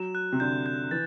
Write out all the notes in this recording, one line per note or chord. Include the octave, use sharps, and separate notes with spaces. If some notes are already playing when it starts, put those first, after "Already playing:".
Already playing: F#3 E7
F#6
C3
D3 G6
G6
E3 A6